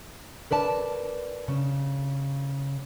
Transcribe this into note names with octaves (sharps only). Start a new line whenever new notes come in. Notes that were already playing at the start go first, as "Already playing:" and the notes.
A#4 B4 D5 A5
C#3